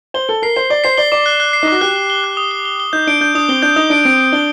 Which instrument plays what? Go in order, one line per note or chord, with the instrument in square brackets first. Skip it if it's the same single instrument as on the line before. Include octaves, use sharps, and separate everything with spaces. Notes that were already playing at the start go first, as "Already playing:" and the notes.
[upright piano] C5 [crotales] G7
[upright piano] A4 [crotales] G7
[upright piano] A#4 [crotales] C7
[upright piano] C5 [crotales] C7
[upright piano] D5 [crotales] G7
[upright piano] C5 [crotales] C7
[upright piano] D5 [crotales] G7
[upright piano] D5 [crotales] D6
[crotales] F#6
F#6
C7
[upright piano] D#4
[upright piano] F#4 [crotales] D6
[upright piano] G4 [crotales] F#6
[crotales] G7
G7
F#6
D#6
G7
G7
G7
[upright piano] D#4 [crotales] G6
[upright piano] D4 [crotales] D7
[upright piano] D4 [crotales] G6
[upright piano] D4 [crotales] D#6
[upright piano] C4 [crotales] G7
[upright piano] D4 [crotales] G6
[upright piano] D#4 [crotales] D#6
[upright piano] D4 [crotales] D7
[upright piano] C4 [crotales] D7
[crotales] D7
[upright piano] D4 [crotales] G7